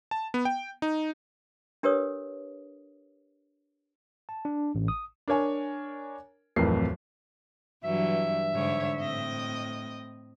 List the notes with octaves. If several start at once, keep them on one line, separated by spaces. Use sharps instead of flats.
A5
B3
G5
D#4
D4 G4 A#4 B4 C#5 D#6
A5
D4
A1
D#6
D4 A#4 C#5 G#5
D1 F2 A2 E3 A#4 C7
G2 E3 F#3 E5
G#2 D3 C#5
A2 C4 D#5